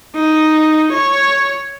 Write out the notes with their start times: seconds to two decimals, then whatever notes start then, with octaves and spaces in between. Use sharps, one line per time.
0.15 D#4
0.93 C#5